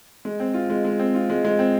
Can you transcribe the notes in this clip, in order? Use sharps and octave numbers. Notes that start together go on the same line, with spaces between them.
G#3
C4
F4
G#3
G#3
C4
F4
G#3
G#3
C4